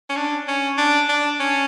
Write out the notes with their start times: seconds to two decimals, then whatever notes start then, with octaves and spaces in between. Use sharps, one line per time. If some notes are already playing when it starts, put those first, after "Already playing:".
0.10 C#4
0.17 D4
0.48 C#4
0.78 D4
1.09 D4
1.40 C#4